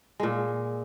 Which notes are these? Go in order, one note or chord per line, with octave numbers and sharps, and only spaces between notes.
A#2 G#3